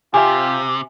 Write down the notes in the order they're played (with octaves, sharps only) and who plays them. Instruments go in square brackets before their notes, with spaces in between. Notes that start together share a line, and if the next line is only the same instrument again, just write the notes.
[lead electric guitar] C3 [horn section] F4 G4 [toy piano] E5 G#5